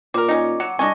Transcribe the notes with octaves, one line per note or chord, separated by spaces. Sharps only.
A#2 A#4 C5 D6
C#4 D#4
F#3 C#7
C2 D4 D#5 G#5 C#6 A#6